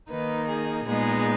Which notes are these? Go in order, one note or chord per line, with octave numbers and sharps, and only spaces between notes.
D#3 A#3 D#4 B4
G#4
A#2 G#3 B3 D#4 G#4